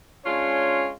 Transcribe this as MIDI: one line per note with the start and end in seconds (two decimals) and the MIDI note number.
0.25 0.92 56
0.25 0.92 61
0.25 0.92 62
0.25 0.92 65
0.25 0.92 73